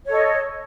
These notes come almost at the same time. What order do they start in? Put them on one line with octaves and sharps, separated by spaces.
C#5 A4 D#5